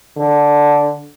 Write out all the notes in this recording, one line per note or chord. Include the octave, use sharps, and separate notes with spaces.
D3